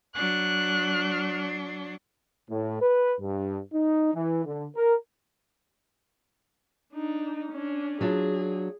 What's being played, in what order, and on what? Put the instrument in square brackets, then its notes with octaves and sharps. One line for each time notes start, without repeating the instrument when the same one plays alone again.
[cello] F#3 D4 [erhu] F#6
[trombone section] A2
B4
G2
D#4
E3
D3
A#4
[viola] D4 D#4
C#4 D4
[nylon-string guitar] F#3 D4 F4 [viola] G#4